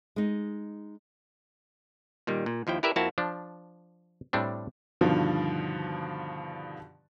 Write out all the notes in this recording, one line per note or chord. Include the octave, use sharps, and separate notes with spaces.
G#3 D#4
A#2 D#3 G3
A#2
D#2 F3 E4 G5
E4 G4 A#4 B4 D5 E5
F2 A#3 C4 E4 F#4 A5
F3 D4
A2 G3 C4 D4
G2 B2 D3 D#3 F3